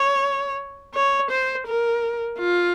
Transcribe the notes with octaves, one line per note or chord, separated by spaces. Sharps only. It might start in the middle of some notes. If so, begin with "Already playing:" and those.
Already playing: C#5
C#5
C5
A#4
F4